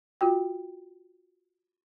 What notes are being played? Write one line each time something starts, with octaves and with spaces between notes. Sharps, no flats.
F4 F#4 G5